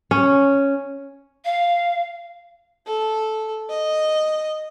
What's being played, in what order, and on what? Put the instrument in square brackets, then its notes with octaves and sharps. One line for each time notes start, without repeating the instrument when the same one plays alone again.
[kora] C#4
[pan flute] F5
[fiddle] A4
D#5